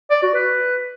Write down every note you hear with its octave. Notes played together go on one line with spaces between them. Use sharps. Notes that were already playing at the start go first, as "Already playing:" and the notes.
D5
F#4
B4